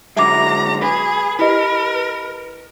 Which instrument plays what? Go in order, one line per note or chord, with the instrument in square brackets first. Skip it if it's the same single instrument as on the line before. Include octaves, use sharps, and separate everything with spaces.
[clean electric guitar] D3 F#3 G#3 [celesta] E5 D6 [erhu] A#5
[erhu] G#4 [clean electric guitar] B4
[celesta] E4 G4 D#5 [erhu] A#4 [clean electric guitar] B4